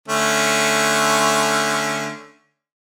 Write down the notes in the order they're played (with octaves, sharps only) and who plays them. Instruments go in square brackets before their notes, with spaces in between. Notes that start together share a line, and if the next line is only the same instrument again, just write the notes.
[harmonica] D3 A3 C#4